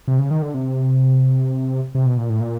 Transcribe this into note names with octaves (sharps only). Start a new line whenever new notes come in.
C3
C#3
D#3
D3
C3
C3
B2
A#2
A2
A#2